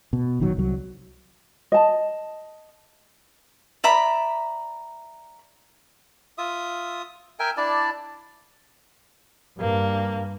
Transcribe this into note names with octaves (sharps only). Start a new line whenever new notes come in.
B2
A#1 D#3 F#3
C2 F#3
D#5 A5
D5 E5 A#5 B5
F4 E5 D#6
A#4 E5 G5 G#5
D4 E4 D5 A5
G2 A#3